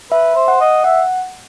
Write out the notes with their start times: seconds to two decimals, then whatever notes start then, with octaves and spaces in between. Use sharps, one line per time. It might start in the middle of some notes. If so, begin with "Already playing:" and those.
0.11 B4 E5
0.35 C5
0.48 F#5
0.61 D#5
0.84 E5 F#5